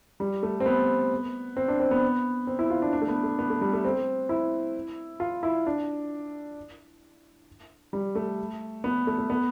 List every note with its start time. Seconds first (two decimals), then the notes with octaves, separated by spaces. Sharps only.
0.20 G3
0.43 A3
0.60 C4
0.66 B3
1.57 C4
1.68 D4
1.80 C4
1.91 B3
2.47 C4
2.59 E4
2.70 F4
2.82 D4
2.93 D4
3.01 A3
3.08 B3
3.23 A3
3.39 B3
3.50 A3
3.61 G3
3.73 A3
3.85 C4
4.29 E4
5.20 F4
5.43 E4
5.67 D4
7.93 G3
8.15 A3
8.84 B3
9.07 A3
9.18 A3
9.30 B3